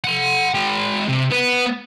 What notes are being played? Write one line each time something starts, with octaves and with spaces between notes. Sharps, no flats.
F#5 C6
G#3 G5
C3
B3